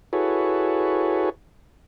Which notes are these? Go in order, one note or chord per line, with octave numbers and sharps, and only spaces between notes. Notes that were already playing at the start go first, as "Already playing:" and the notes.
E4 F#4 G#4 A4 B4 C#5